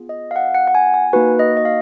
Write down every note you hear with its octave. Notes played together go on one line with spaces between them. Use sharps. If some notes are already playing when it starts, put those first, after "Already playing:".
Already playing: B3 F4 G#4
D#5
F5
F#5
F#5
F#5
G#5
G#5
A#3 D#4 F#4 B4
D#5
D#5
F5